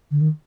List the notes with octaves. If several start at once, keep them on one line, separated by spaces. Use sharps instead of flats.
D3
D#3